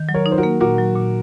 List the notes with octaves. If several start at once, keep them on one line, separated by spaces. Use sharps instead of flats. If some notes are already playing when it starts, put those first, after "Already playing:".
Already playing: D#3
F#3
A#4 C#5
D#4
C5
F#4 A#4
A#3
A#2 F#4 A#4
F#3
A#2